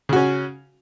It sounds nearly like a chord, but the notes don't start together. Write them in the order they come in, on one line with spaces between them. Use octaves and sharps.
C#3 F#4 C#4